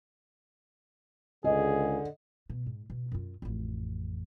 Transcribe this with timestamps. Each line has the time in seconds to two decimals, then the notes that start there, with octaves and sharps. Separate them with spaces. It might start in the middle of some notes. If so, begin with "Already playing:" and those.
1.44 C#2 D3 G#4 D#5
2.50 B2
2.66 G#2
2.90 B2
3.12 F#2 F4
3.42 A1 F2